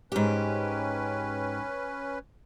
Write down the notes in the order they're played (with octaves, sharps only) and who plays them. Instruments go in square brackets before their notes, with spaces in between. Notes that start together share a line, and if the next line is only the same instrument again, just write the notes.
[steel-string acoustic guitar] G#2 G4 [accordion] C#4 B4